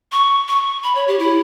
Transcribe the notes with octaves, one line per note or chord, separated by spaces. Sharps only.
C#6
C#6
B5
C#5
G4
E4